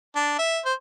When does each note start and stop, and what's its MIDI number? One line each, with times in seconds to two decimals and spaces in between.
0.16 0.35 62
0.39 0.60 76
0.65 0.73 72